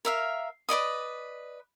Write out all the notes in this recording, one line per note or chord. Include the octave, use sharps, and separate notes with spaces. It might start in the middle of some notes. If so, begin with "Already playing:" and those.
A#4 E5 F5
B4 D5 D#5 D#6